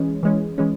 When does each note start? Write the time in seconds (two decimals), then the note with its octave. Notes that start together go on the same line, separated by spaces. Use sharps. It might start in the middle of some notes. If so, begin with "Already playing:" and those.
Already playing: E3 G#3 C#4
0.23 E3 G#3 C#4
0.58 E3 G#3 C#4